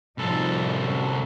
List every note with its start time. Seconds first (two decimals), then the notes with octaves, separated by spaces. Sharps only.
0.18 C2 A2 F3 D#4 A4
0.78 F#2 D3 F#3